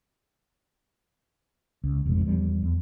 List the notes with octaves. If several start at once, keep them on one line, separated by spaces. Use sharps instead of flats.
C#2
F1 B1 F2 G#2
E2 F3 G3
E2